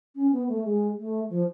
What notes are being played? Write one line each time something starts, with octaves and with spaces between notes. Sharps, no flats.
C#4
B3
A3
G#3
A3
F3